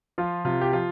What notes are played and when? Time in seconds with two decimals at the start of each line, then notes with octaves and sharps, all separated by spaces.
0.18 F3 F4
0.45 C3 F4
0.61 G4
0.73 F3 F4